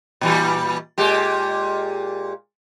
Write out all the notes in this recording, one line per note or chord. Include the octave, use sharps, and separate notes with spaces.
A#2 E3 G3
A#2 G#3 G4